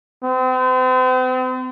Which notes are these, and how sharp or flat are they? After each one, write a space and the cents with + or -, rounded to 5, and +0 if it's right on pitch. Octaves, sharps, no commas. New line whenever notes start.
C4 -40